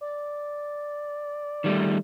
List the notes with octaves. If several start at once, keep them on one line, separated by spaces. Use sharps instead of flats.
D5
D#3 G3 A3